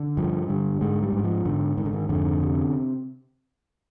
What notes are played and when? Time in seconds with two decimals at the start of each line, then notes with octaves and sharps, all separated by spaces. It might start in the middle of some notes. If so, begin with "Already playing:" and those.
Already playing: D3
0.17 G2 F3
0.48 D3 G3
0.81 G#2 G#3
1.03 G3
1.13 G#2
1.24 F3
1.45 G#2 D3
1.77 G#2 D#3
1.85 D3
1.93 D#3
2.09 F2 D3
2.41 C3